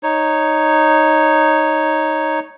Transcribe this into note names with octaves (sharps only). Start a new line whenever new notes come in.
D#4 C#5